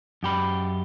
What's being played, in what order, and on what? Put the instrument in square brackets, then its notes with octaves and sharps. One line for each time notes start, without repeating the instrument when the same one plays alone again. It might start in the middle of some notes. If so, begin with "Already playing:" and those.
[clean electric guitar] F#2 G4 B5